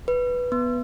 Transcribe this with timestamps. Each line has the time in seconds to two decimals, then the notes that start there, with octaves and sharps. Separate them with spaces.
0.08 B4
0.52 B3